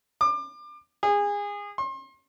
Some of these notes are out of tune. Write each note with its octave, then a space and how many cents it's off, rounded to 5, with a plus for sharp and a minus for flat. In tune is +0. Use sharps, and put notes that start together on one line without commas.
D6 +30
G#4 -25
C6 +35